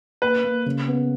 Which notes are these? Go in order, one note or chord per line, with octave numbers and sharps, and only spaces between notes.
A#3 B4
A#3
C#3
B3